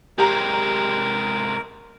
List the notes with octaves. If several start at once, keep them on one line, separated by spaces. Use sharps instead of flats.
C3 G#3 G4 A#4 A#5